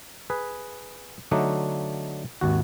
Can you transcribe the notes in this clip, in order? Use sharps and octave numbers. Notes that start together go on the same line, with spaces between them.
G#4 B4
D3 F#3 A3 D4 D#4
G#1 D#2 F#4